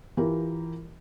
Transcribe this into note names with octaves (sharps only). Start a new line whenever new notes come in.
E3 E4 F4 G4 A#4